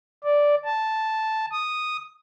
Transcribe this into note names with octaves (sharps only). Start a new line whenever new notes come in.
D5
A5
D#6